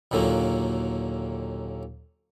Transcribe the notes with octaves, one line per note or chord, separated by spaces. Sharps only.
D#2 A#2 D3 F#3 A#3